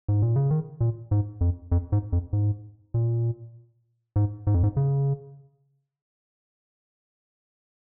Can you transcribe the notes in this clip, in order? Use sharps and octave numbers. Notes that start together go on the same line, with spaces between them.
G#2
A#2
C#3
D#3
A#2
G#2
F2
F2
G#2
F2
G#2
A#2
G#2
G#2
F2
G#2
C#3